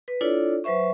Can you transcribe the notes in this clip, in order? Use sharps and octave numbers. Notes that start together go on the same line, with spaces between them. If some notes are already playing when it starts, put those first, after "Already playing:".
B4
D4 E4 F4 A4 C#5 D5
F#3 B4 C5 E5 C#6